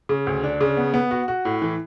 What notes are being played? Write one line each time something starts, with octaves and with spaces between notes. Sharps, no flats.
C#3
D2
D4
C#3
B3
B3
F#4
F#4
A2
E3